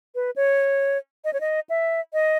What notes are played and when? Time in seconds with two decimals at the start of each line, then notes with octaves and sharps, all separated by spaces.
0.15 B4
0.36 C#5
1.25 D#5
1.33 C#5
1.41 D#5
1.70 E5
2.13 D#5